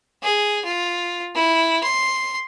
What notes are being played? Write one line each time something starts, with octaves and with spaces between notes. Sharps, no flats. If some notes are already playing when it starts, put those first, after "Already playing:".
G#4
F4
E4
C6